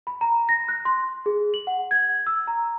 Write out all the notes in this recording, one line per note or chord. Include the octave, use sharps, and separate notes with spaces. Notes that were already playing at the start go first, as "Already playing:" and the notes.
B5
A#5
A#6
F#6
C6
G#4
F#7
F#5
G#6
E6
A#5